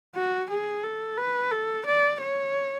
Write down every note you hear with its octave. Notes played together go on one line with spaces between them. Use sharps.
F#4
G#4
A4
B4
A4
D5
C#5